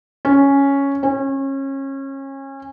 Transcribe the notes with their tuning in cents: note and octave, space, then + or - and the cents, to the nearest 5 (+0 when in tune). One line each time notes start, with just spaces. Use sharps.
C#4 +0
C#4 -30